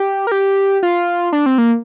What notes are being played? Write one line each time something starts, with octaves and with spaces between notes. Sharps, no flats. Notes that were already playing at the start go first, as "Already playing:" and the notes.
Already playing: G4
A#4
G4
F4
D4
C4
A#3